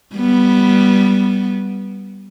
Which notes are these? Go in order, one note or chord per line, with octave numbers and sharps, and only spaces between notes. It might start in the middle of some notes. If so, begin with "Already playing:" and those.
G3 B3